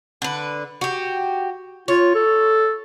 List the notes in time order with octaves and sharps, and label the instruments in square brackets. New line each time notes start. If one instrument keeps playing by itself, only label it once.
[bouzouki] D3 B4
F#4 G4
[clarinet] F4 [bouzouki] C#5
[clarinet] A4